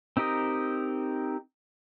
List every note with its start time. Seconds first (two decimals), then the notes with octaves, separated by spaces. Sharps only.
0.17 C4 D#4 G4 A#4 D#5